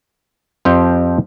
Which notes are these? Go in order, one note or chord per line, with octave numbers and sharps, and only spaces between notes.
F2 F3 C4 G4